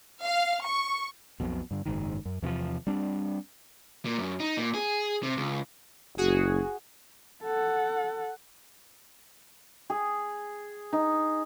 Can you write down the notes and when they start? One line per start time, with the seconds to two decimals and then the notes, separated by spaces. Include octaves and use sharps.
0.25 F5
0.67 C#6
1.40 B1 F2 B2
1.71 G2 D3
1.86 F#1 G#2 D#3
2.25 F#2
2.42 E2 C3 D#3 F3
2.87 G3 C4 D4
4.05 A#2
4.19 F#2
4.40 D#4
4.57 A#2
4.74 G#4
5.23 C3
5.37 C#2
6.18 F#1 F#4 G#4
7.43 A4 F#5
9.90 G#4
10.93 D#4